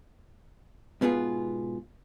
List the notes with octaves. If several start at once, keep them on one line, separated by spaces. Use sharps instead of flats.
G#2 B2 B3 F4 G#4